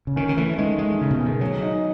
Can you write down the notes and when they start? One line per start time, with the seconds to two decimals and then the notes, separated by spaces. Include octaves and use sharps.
0.07 C#3
0.16 D#3 C#4
0.29 D#3
0.37 E3 A3
0.58 D#3 G#3
0.78 G#3 G#4
0.99 C#3 C#4
1.10 B2
1.20 G#4
1.26 D#3
1.41 F#3 G#4
1.62 D#4